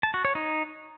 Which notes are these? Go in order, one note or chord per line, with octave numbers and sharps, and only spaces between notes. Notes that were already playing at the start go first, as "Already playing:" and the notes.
A5
F#4
C#5
D#4